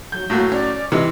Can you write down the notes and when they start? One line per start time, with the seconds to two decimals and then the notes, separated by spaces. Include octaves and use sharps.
0.12 F#3 G6
0.30 A2 F#3 A#3
0.52 C#4 D5
0.92 C3 E3 D#5